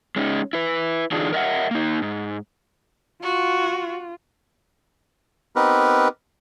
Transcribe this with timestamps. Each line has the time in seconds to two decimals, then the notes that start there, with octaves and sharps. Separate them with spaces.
0.16 G#3 C#4 D#4
0.53 E4 B4
1.12 D3 E3 D4 D#4 F4 G#4
1.33 A#4 D#5 E5 F#5
1.71 A#3 D#4
2.02 G#2
3.23 F4 F#4
5.56 B3 C4 D#4 G4 A#4 B4